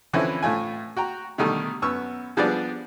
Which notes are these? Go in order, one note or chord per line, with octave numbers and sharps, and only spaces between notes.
D3 E3 F3 C4 C#4 E4
A2 A3 F4 G#5
F#4 G5 A#5
B2 D3 D#3 G3 A3
F#2 B3 C#6 E6 F6
F3 G3 B3 D4 G#4 D5